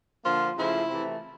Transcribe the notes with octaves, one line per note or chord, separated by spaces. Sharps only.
D3 F3 A#3 F4
C#3 F3 A3 E4
C3 E3 A3